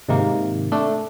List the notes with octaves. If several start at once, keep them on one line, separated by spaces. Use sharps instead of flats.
G#2 C3 D#3 A#3
A3 D4